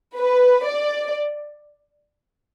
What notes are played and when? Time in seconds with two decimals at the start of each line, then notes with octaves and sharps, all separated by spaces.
0.16 B4
0.67 D5